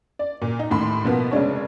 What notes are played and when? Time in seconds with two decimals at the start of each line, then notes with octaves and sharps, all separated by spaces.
0.19 D5
0.42 A#2
0.59 D#4
0.71 D#2 A2 B5 C6
1.05 B2 F3 A#3 B3
1.32 F1 C#3 G#3 D4 C#5